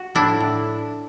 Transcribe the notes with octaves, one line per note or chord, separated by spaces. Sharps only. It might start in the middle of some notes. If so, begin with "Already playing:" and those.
Already playing: F#4
A2 D4 E4
A2